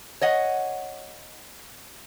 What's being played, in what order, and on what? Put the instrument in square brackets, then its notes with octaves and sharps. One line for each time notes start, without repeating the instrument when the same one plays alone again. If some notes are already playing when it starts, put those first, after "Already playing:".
[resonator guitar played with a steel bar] C#5 D#5 F#5